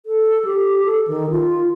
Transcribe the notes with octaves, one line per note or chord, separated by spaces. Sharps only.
A4
G4
A4
D#3
F4